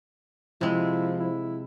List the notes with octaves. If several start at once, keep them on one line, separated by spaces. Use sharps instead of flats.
C3 F3 G#3 E4
E4